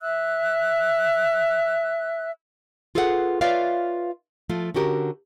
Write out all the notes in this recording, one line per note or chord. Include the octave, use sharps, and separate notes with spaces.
E5 E6 F#6
F4 G#4 A4 B4 D#5 F#5
F4 B4 C#5 D5 E5 F5
F3 A3 F4
D3 C#4 F#4 G4 A#4